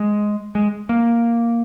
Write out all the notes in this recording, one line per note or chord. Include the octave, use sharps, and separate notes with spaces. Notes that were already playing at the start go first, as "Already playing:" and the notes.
Already playing: G#3
G#3
A#3